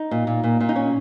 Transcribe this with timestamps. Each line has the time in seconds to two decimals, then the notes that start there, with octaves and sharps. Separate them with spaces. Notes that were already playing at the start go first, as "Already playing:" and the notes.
Already playing: D#4
0.11 A#2
0.27 A#2
0.43 A#2
0.61 A#2
0.69 D#4
0.76 C#4